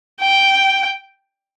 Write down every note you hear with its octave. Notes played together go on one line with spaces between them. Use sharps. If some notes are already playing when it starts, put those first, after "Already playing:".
G5